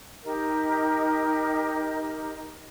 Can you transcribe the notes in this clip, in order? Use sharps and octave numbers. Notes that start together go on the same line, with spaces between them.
D#4 G4 A#4 D#5